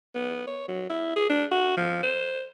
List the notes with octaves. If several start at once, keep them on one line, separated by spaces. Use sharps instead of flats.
B3
C#5
F#3
E4
G#4
D4
F#4
F3
C5